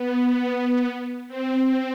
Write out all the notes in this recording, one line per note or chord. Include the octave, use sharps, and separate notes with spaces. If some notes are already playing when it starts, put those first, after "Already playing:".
Already playing: B3
C4